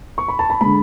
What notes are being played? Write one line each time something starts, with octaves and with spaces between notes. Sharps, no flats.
C#6
B5
A5
B5
D3 G#3 B5